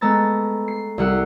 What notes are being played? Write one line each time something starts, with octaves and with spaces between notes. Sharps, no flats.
G#3 A3 B3 A#5 E6 A6
C7
C2 G3 F#5 E6 C7